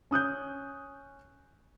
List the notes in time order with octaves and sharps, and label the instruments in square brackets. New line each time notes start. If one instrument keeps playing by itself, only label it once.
[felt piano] C#4 D#6 F#6 G6